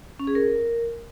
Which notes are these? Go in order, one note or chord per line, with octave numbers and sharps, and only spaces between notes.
C#4
G#4
A#4